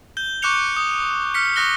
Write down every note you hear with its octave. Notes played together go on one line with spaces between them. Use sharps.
G6 G7
C#6 D6 F#6 G6 C#7 F7
D#6
F6 B6 C#7
C#6 D#6 F#6 A#6 G7